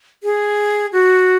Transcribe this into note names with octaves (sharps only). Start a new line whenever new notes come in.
G#4
F#4